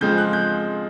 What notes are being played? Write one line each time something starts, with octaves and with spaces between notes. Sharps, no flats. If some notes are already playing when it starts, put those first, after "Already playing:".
C#3 F3 G#3 C4 G6
F#6
G6